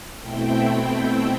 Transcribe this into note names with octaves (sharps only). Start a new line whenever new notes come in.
B2 A3 C4 E4 G5